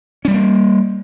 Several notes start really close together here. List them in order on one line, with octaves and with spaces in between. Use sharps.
C#4 G3 A3 A#3